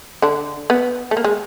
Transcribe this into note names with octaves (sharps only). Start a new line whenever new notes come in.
D3 D4
B3
A3
A#3
G#3